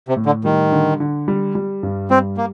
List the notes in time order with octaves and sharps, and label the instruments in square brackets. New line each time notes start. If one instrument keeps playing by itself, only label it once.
[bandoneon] C3
[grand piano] A2
[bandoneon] D3
[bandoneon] D#3 [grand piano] G3
[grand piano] D3
D3
G3
G3
G2
[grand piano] G3 [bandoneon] C4
[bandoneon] A#3